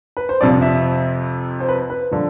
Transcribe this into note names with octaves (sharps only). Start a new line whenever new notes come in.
B4
C5
F2 C3 F3 D5
E5
C5
B4
B4
D3 F3